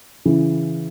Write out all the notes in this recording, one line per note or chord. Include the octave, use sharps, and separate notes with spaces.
C#3 E3